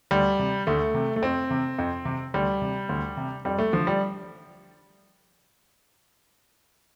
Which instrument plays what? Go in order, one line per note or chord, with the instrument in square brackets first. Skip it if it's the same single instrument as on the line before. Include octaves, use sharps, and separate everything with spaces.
[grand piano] D2 G3
C3
D2 A3
C3
A3
F2 C4
C3
F2
C3
D2 G3
C3
D2
C3
F2 G3
A3
D3 F3
G3